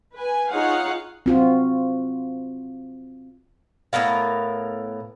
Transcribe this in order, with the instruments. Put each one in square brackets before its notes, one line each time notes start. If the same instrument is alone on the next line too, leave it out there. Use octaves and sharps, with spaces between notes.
[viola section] B4 G#5
D#4 F4 G#4 C#5 F5 F#5
[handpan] C4 F4 F#4
[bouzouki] A2 B3 A#4 F5